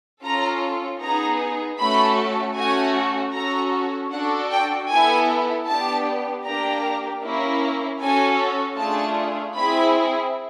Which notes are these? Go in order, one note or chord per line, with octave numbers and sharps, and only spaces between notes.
C#4 F4 A4 A#5
B3 D#4 G#4 A#5
A3 C#4 F#4 A4 B5
A3 C#4 F#4 G#5
C#4 F#4 A4 A#5
D4 F#4 A4 F#5
G5
B3 E4 A4 G#5
B3 D4 G4 A5
A#3 D4 G4 A#5
A#3 C#4 E4
C#4 F#4 A4 G#5
A3 D4 F4 G#4 A5
C4 E4 G#4 B5